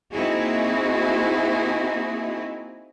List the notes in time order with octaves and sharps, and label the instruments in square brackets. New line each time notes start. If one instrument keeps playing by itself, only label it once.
[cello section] A#3 C4 D#4 E4 F#4 G#4